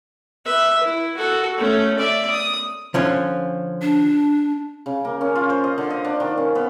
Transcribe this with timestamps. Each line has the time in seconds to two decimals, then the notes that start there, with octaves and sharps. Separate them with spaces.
0.45 B4 E5
0.84 E4
1.17 F#4 A4
1.58 A3 C#4
1.99 D5 E5
2.31 D#6
2.94 D3 F3 C#4
3.82 D4
4.86 C#3
5.05 A#3
5.21 C#4
5.35 F4
5.50 C5
5.64 D#5
5.78 D3
5.90 D#5
6.04 D4
6.20 D#3
6.37 C#4
6.55 B3